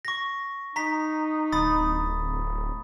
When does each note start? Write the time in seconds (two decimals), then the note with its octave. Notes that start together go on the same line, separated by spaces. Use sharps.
0.05 C#6 A#6
0.76 D#4 A#5 B6
1.52 D1 B5 D#6 A6